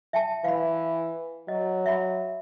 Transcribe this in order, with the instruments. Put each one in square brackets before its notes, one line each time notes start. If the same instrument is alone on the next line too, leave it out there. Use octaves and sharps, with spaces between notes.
[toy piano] E5 G5 A5
[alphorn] E3 [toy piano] F5 B5
[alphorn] F#3 [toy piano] D#5
[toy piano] E5 B5